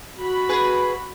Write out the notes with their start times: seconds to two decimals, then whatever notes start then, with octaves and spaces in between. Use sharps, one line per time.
0.17 F#4 B5
0.49 G#4 B4